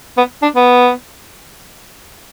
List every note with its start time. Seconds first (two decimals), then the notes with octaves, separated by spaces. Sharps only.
0.18 B3
0.42 D4
0.56 B3